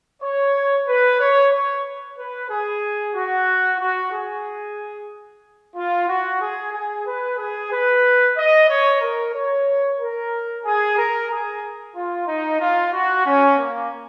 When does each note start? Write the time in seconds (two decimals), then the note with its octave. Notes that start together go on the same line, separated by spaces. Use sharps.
0.21 C#5
0.87 B4
1.19 C#5
1.52 C#5
2.17 B4
2.49 G#4
3.15 F#4
3.80 F#4
4.12 G#4
5.75 F4
6.08 F#4
6.41 G#4
6.74 G#4
7.06 B4
7.38 G#4
7.71 B4
8.37 D#5
8.69 C#5
9.01 A#4
9.34 C#5
10.00 A#4
10.65 G#4
10.97 A#4
11.31 G#4
11.96 F4
12.27 D#4
12.60 F4
12.93 F#4
13.25 C#4
13.58 A#3